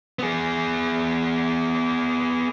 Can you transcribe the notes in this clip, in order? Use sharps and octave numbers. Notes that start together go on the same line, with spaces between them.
B3 G#4